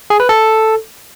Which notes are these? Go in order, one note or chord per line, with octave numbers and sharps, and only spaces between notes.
G#4
B4
A4